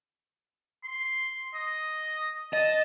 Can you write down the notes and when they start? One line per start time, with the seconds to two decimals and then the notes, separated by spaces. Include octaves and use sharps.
0.84 C6
1.54 D#5
2.53 D#5 A5